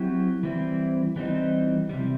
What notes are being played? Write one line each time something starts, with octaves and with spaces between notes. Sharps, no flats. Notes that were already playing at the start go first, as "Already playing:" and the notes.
Already playing: F#3 C4 E4 G4
E3 G3 C4 E4
E3 G3 C4 D#4
C3 E3 G3